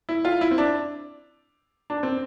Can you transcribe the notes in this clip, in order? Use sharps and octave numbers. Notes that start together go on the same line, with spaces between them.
E4
F4
E4
C4
D4
D4
C4